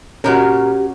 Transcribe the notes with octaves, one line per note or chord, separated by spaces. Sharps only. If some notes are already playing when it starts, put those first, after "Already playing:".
A#2 D#3 C#4 F#4 G4 A#4